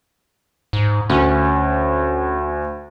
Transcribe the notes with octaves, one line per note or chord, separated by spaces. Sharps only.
G#2
D2 C#4